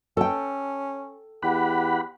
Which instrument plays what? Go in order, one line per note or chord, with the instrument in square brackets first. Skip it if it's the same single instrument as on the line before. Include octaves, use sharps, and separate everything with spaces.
[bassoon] C#4 [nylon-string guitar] A4 G5
[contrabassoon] E2 [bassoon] G4 [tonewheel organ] F#5 B5